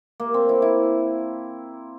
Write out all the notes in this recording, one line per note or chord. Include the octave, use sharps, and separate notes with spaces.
A#3
C4
E4
E4